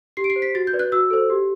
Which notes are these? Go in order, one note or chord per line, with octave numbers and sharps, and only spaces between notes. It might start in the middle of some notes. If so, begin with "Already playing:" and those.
G4 C7
D7
C7
C5
B6
F#4 A6
G6
B4 D5
F#6
F#4 E6
A4 C5
G4